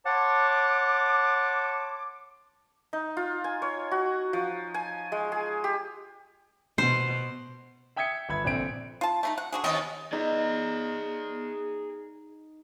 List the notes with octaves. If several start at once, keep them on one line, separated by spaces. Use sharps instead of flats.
C#5 F#5 A5 C6 D6
D#4
F4
G#5
C#5
F#4
F3
G#5
G#3
G#4
G4
B2 C5
E5 G5 D#6 G#6 B6 C#7
G1 E5 B5 G#6
A#1 D3 C4 D7
F4 A5
A3 D4 D#4
F#5
D3 F#4 G#4
D#2 C3 B3 C#4 D#5
D#4 G#4 D5